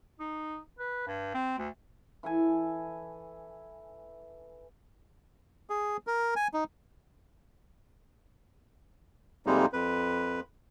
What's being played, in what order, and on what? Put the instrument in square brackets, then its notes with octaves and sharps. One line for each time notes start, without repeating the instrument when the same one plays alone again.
[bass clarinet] D#4
B4
G2
C4
D2
[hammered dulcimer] E3 A4 G#5
[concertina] G#4
A#4
G#5
D#4
[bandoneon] F2 C3 G3 G#3 A#3 D#4
F2 B4